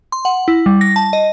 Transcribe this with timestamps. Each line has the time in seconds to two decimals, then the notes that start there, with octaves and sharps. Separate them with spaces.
0.12 C6
0.25 F#5
0.48 E4
0.66 G3
0.81 A#6
0.96 A5
1.13 D#5